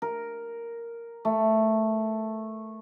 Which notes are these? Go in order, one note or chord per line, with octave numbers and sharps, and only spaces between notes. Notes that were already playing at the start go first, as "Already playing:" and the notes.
A#4
A3